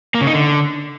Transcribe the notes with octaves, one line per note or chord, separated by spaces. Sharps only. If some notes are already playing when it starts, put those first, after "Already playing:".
A#3
C#3
D#4
D3